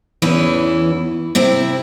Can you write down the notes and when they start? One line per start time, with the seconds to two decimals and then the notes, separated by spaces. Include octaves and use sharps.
0.22 E2 E3 C#4 E4
1.35 C3 C4 E4